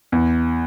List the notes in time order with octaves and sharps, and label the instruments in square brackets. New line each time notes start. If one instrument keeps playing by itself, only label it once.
[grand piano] E2